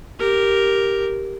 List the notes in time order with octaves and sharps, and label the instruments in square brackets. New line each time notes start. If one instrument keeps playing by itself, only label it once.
[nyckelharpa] G4 A#4